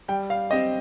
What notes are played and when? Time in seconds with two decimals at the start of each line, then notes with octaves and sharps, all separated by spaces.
0.08 G3 G5
0.30 F5
0.51 C4 G4 D#5